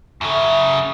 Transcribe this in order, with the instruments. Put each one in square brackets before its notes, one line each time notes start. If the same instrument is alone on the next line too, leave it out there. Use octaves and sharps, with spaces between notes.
[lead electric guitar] F#2 C#3 [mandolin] E4 A4 C#5